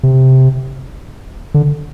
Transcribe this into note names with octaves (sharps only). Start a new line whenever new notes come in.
C3
D3